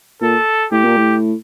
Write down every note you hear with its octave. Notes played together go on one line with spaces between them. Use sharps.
A#2 A4
A2 G4
A#2
A2